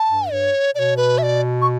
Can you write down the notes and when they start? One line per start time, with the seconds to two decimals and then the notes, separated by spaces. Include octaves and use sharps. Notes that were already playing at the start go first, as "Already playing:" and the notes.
Already playing: A5
0.09 G2
0.31 G2 C#5
0.75 B2 C#5 D5
0.97 B4
1.18 E5
1.23 D5
1.62 C#6